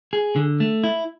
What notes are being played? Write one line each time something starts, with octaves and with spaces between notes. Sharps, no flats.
G#4
D3
A3
E4